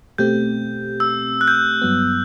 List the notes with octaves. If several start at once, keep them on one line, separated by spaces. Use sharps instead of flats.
B2 A3 C4 G4 G6
E6
F#6
G6
F#6
G2 F#3 B3